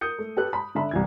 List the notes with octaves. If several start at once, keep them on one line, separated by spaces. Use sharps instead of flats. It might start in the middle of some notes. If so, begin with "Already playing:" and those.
A#4 D#6 G6 C#7
A3
G4 A4 B4 F#6
B5
D3 E5 B5
C2 E3 G#6